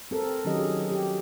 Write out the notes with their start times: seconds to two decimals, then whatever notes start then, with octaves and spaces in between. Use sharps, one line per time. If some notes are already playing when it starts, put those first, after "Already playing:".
0.11 C4 A4 A#4
0.45 D#3 F#3 C#4 G4 D#5
0.58 C#4 G#4
0.92 G4